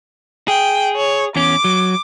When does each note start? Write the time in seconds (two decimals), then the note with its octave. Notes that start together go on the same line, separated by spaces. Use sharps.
0.48 G#4 G5
0.96 C#5
1.36 E2 C#4 D6
1.64 F#3